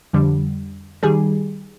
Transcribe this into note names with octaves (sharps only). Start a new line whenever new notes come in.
F2 D3 G3
D#3 G3 G#4